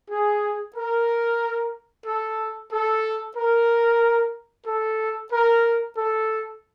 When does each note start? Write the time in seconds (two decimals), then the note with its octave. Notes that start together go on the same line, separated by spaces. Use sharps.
0.11 G#4
0.76 A#4
2.06 A4
2.72 A4
3.37 A#4
4.67 A4
5.32 A#4
5.98 A4